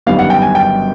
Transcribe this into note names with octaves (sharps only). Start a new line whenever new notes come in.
G1 F#2 D#3 G3 B3 F5
F#5
G5
G#5
G5